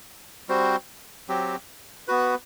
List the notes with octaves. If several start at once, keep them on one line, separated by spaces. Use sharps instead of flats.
G3 C4 F#4 C5
F#3 C4 G4
B3 F#4 B4